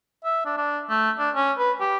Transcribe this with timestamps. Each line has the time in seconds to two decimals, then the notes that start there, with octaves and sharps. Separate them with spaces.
0.25 E5
0.46 D4
0.57 D4
0.89 A3
1.19 D4
1.36 C#4
1.58 B4
1.80 G4